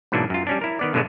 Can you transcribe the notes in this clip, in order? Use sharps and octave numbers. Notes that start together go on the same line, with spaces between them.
G#2 B2 E3 F#3 A#3 D4
F#2 F4
G3 C#4 D4
E4 A#4
D#3 B3 D5
G2 B2 D3 F#3 G#3 A3